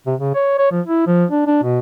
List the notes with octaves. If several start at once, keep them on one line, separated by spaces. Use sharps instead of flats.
C3
C#3
C#5
C#5
F3
E4
F3
D4
D4
B2